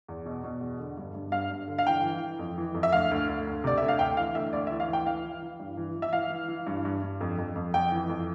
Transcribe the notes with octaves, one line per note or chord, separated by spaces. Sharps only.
E2
B2
B2
E2
D3
G2
G2
G2 F5
G2
D3
F5
E3 G5
E3
E3
F2
E3
F2
E5
D2 F5
D2
D2
D2
C3 D5
D2 E5
F5
D2 G5
E3 F5
D2 E5
D2 D5
E5
E3
F5
E3
G5
E3 F5
E3
E3
G2
E3
E3
E5
E3 F5
E3
E3
G2
G2
G2
F2
F2
F2
F2 G5
E3
F2